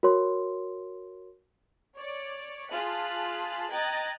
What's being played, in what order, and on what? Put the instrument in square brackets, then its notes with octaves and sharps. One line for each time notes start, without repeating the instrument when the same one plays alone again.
[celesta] F#4 A#4 C#5 C6
[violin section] C#5 D5
F4 G#4 A5 F#6 B6
D#5 G5 A#5 F#6 G#6 A6